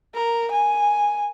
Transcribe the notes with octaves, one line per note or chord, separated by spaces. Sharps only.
A#4
G#5